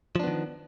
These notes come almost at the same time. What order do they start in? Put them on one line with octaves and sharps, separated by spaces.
F3 D4 B3 D#3